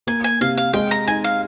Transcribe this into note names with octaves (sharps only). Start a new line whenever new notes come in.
A#3 G#5
G#5
C3 F5
F5
G#3 G5
A#5
D#4 G#5
F5